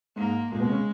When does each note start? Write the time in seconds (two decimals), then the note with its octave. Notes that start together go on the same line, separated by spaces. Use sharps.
0.16 G#2 G#3 A#3
0.51 A#2 G#3 A#3
0.60 B2 B3
0.69 C#3 C#4